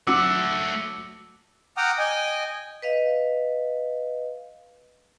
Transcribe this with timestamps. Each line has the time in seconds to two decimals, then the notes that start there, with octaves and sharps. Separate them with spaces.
0.07 F#3 A3 F#5 D6 E6
1.77 F#5 G5 A#5 D6 D#6 F6
1.98 D#5 G5 G#5
2.82 B4 D#5 F5